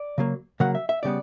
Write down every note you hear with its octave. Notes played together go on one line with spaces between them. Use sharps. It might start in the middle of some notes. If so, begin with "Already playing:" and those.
Already playing: D5
C#3 F#3 A#3
C#3 F#3 A#3 F#5
E5
E5
C#3 G3 B3 D5